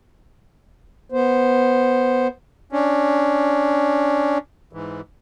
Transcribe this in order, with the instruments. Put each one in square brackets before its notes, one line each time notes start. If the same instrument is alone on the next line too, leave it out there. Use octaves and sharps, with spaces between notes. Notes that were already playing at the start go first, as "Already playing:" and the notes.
[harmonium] B3 C5
[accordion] C#4 D4
G#2 E3